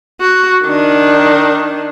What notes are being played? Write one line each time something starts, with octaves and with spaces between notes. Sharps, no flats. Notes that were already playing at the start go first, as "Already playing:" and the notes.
F#4
D#3 D4